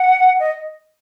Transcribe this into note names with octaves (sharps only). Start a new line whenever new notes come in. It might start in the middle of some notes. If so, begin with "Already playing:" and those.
Already playing: F#5
D#5